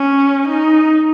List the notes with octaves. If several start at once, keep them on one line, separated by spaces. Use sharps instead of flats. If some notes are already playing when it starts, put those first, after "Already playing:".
Already playing: C#4
D#4